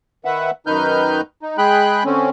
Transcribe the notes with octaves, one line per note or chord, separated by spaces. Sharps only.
D#3 B4 E5 F#5
F#2 D#3 D#4 B4 F6 G6
D#4
G#3 G#4 G5 B5 F#6
D3 C4 C#4